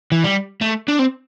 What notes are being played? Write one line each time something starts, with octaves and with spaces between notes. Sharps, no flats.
E3
G3
A3
D4
C4